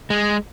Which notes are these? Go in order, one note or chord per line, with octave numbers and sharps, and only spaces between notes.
G#3